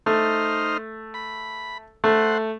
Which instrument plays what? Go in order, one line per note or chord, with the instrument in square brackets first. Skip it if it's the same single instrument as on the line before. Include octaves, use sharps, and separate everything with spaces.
[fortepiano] A3 [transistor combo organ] D#4 C5 F6
[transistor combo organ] B5
[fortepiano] A3 [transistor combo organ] C5 F#5